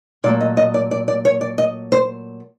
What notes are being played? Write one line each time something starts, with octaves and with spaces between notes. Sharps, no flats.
A#2 F#3 A3 D5
D#5
D#5
D5
D5
D5
C#5
D5
D#5
C5